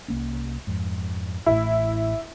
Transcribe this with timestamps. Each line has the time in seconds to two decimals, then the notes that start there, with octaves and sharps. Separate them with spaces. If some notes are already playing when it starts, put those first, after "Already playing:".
0.08 C2 A#3 C#4
0.67 F2 G#2
1.46 A1 A2 E4